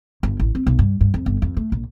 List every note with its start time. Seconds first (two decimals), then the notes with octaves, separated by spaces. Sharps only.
0.23 G1
0.40 A1
0.55 C4
0.67 B1
0.79 G2
1.01 G2
1.14 F2
1.26 G1
1.42 F2
1.57 A3
1.72 A#1